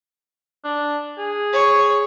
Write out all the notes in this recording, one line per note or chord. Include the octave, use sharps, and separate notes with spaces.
D4
G#4
C#5